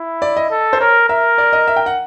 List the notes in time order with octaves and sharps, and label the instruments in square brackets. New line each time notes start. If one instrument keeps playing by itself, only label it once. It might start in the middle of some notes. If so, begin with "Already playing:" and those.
Already playing: [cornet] E4
[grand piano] D5
D#5
[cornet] A4
[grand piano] C5
[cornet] A#4 [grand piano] C#5
[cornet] A#4 [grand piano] E5
[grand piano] D5
D#5
E5
G5
F#5